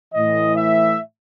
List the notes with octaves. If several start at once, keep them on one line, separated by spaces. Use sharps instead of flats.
A2 E3 D#5
E5